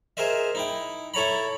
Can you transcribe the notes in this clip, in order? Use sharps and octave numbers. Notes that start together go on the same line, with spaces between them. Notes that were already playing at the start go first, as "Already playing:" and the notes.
G#4 A#4 C5 D#5 E5
D#4 E4 G5
E4 A4 C#5 A#5 B5